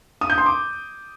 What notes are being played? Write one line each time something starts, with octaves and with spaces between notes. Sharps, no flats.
D#6
G6
C6
D6